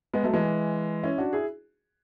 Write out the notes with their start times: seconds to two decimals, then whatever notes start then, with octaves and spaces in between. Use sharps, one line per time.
0.14 G#3 B3
0.23 F#3 A3
0.33 E3 G#3
1.03 C#4 E4
1.18 D4 F#4
1.33 E4 G#4